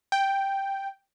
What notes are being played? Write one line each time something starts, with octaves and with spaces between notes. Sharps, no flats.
G5